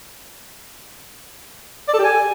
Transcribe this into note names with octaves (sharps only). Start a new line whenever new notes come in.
D5
A4
G4
G#5